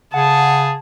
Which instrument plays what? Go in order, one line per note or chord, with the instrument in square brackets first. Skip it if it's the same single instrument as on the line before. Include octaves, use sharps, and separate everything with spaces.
[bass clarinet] C#3 [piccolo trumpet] G#4 [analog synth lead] F#5 [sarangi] A5